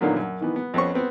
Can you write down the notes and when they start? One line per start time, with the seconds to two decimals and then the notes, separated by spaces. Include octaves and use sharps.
0.01 A#2 D3 D#3 F#3 A#3 B3
0.17 F#2
0.41 D#3 E3 B3
0.56 B3
0.74 F2 B3 C#4 C5 C#6
0.94 B3 C4 B4